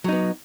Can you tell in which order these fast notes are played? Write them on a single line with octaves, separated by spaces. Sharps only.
F#3 D#4 B3